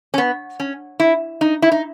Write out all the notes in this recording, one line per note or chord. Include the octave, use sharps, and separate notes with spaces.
C#4
B3
C#4
E4
D#4
E4
D#4